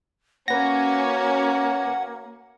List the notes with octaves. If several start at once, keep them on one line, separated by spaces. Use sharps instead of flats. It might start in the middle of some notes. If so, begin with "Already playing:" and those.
A#3 C#4 F#4 B4 C#5 F#5 A#6